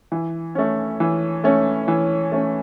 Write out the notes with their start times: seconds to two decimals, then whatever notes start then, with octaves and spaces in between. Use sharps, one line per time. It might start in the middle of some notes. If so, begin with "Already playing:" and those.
0.12 E3
0.55 A3 C#4
1.00 E3
1.44 A3 C#4
1.88 E3
2.32 A3 C#4